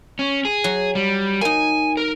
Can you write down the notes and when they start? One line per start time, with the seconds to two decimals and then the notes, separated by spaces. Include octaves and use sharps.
0.19 C#4
0.45 G#4
0.64 F#3
0.95 G3
1.41 A#3 D#4 G#5
1.97 A#4